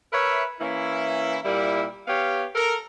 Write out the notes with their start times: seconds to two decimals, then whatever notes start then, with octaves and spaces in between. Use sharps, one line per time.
0.12 A#4 B4 C#5 E5
0.60 E3 A#3 C#4 E4
1.44 A#2 G3 A#3 E4
2.07 B3 G4 C#5 F5
2.55 A4 A#4